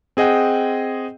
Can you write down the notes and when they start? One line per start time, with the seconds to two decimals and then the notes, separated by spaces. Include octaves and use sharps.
0.17 C4 G#4 D#5 F#5 G5